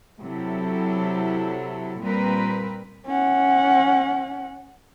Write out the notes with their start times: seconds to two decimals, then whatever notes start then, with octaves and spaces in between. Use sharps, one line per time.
0.20 C3 F#3 E4 A4
2.01 A#2 G3 C4 A#4 B4
3.07 C#4 F#5